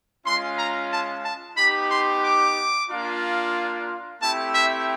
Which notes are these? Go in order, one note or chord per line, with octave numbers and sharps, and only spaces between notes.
G#3 C#4 F4 C6
A#5
A5
A5
B3 D#4 G4 B5
C6
D6
A#3 D4 F4
A3 C4 E4 G4 A5
E5